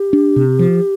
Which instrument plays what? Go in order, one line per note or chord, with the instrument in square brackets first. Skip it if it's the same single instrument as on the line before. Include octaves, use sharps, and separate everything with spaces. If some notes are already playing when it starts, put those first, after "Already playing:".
Already playing: [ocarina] G4
[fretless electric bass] D4
C3
F3